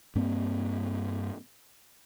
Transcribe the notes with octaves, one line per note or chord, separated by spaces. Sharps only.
G2 A#3 C4